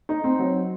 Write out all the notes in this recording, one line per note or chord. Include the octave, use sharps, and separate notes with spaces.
D#4
C4
F#3